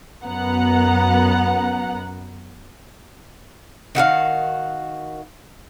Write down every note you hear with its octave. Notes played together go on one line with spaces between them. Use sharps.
F#2 B3 F#5 A#5
D#3 F#4 G#4 F5